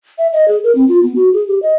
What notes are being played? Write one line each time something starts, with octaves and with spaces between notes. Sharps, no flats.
E5
D#5
G#4
A#4
C4
F4
B3
F#4
G#4
G4
D#5